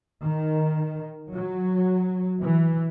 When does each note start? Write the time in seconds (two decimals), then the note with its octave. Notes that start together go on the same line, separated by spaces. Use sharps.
0.24 D#3
1.32 F#3
2.42 E3